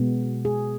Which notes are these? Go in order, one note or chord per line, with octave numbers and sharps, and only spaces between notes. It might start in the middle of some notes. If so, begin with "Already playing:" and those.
Already playing: B2 G#3 B3
G#4